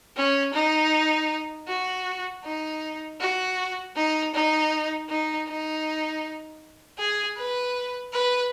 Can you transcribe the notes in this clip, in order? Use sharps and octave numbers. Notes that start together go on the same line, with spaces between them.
C#4
D#4
F#4
D#4
F#4
D#4
D#4
D#4
D#4
G#4
B4
B4